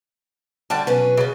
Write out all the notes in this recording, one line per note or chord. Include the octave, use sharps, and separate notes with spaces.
D3 G3 F#4 A5
B2 F#3 C#4 B4
C#3 B3